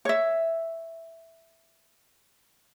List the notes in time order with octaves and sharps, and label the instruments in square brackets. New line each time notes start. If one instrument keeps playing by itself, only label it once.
[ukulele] C#5 E5